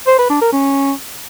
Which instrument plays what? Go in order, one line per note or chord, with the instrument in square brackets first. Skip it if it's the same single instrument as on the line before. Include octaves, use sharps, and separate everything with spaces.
[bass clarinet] C5
B4
D4
A#4
C#4